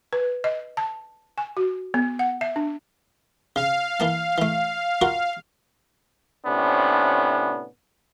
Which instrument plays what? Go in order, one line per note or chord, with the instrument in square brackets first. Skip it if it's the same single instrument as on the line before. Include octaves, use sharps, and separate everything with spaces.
[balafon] B4
D#5
A5
G#5
F#4
B3
F#5
E5
D4
[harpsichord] C#3 [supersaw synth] F5
[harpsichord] E3 A#3 A5
E3 A3
F4 F#4 A#4
[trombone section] A2 C3 B3 C#4 D4